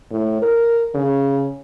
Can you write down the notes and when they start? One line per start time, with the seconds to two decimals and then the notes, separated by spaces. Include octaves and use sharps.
0.11 A2
0.42 A#4
0.95 C#3